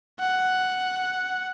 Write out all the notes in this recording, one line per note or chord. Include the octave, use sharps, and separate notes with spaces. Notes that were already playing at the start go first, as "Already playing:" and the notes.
F#5